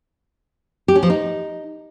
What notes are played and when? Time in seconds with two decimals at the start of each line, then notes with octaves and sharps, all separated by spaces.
0.88 G4
0.95 C#4
1.03 F3
1.10 D#4